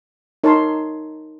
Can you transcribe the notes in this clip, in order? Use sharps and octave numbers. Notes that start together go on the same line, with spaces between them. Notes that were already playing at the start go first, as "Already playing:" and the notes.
D#4 A#4 C#5 A5 C6